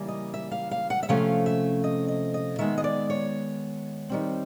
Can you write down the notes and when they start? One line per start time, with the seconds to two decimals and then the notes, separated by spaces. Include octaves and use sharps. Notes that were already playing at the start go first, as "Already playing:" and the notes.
Already playing: C#3 E3 G3 A#3
0.08 D#5
0.34 E5
0.52 F5
0.71 F5
0.90 F#5
1.03 E5
1.09 C3 F3 A3 C#4 F5
1.46 E5
1.84 D#5
2.08 D#5
2.34 D#5
2.59 D#3 G#3 B3 E5
2.78 D#5
2.84 D5
3.10 C#5
4.09 D#3 G3 C4